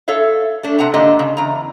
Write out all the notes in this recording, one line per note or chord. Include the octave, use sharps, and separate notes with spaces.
A4 C#5 E5 F5
A3 D4
C3 F#5 A5 A#5
G#2 D3 A#3 D4 G4 D#5
C#3
E2 A#5